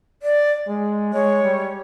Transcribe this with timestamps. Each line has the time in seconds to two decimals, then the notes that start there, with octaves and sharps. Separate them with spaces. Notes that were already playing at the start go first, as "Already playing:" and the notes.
0.23 D5
0.68 G#3
1.13 G#3 C#5
1.44 G3